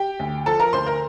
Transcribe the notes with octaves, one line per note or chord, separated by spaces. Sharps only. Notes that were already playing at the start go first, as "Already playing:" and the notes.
Already playing: G4 G5
D2
F3 A4 A5
A#4 A#5
D2 C5 C6
A#4 A#5